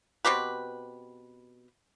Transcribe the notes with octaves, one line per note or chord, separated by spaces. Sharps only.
B2 C4 G4 B4